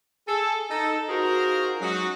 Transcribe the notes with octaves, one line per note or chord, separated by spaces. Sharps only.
G#4 A4
D#4 A4
D#4 F4 F#4 G#4 A#4 C5
F#3 G#3 C#4 D#4 F#4